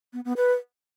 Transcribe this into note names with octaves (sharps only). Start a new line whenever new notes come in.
B3
B3
B4